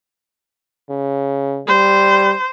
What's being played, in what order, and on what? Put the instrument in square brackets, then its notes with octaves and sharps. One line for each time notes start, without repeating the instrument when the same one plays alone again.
[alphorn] C#3
[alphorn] G3 [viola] C5